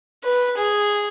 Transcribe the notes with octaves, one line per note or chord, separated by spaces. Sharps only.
B4
G#4